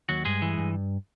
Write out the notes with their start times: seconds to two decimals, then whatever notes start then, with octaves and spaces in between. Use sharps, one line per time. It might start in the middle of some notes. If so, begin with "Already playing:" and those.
0.09 D#2 F#3 F#4
0.25 G2 G#3 G#4
0.42 E3
0.58 G2